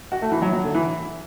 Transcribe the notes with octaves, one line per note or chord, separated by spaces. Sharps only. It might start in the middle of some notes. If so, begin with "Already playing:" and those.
F#4
A3
E3
F#3
F#3
D3
E3